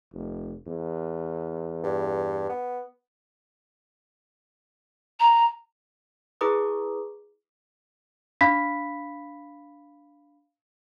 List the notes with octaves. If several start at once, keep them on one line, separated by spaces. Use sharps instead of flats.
F1
E2
G2
B3
A#5
E4 G#4 B4 A#5 D6 D#6
D4 F5 B5 B6